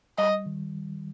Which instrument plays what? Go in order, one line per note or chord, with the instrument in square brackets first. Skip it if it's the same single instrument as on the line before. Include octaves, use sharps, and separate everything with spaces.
[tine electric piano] G3 [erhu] D#5
[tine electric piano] D#3